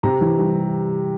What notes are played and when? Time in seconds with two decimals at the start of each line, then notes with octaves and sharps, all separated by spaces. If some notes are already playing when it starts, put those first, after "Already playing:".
0.03 C3 A#5
0.21 E3
0.38 G3